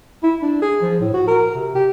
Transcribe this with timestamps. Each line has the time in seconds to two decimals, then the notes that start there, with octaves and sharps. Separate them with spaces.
0.23 E4
0.42 D4
0.62 G#4
0.82 F3
1.00 A2
1.14 F#4
1.27 A#4
1.55 C3
1.75 G4